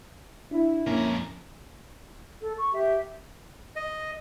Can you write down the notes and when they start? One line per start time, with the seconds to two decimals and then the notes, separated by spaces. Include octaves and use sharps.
0.51 D4 E4
0.87 F2 A#3 C#4 A#4
2.39 A4
2.56 C#6
2.72 G4 E5
3.76 D#5